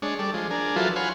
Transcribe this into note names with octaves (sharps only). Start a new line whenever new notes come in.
G#3 D4 C#5
G3 A4 D5
F3 G#3
D4 G#4 A#4
F3 F#3 E4 F4 A4 B4
C#5 F5 F#5 G#5 B5 C6